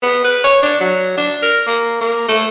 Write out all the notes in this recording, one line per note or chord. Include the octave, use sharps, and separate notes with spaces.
B3
B4
C#5
D4
F#3
D4
A#4
A#3
A#3
A3